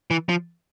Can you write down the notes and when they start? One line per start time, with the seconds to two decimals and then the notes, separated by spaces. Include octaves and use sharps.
0.11 E3
0.29 F3